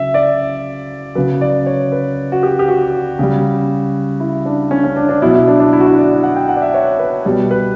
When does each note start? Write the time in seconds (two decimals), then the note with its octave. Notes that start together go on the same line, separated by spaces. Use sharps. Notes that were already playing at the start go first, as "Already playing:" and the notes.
Already playing: C#3 F#3 E5
0.14 D5
1.15 C#3 F#3 B4
1.41 D5
1.66 C#5
1.92 B4
2.32 F#4
2.43 G4
2.59 G4
2.68 F#4
3.19 C#3 G3
4.20 E4
4.46 D4
4.71 C#4
4.84 C#4
4.96 D4
5.09 D4
5.22 B2 F#3 E4
5.35 E4
5.48 D4
5.60 D4
5.73 E4
5.80 F#4
5.87 E4
5.98 D5
6.23 F#5
6.36 G5
6.49 F#5
6.56 D5
6.62 E5
6.74 C#5
6.99 B4
7.25 B2 G3
7.51 B4